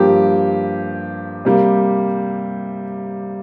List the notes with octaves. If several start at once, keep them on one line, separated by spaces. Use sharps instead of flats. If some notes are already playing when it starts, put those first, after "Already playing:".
Already playing: G2 F3 A#3 G4
C3 G3 A#3